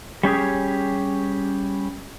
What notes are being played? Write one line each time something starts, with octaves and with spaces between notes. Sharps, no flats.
G3 C#4 G4 G#4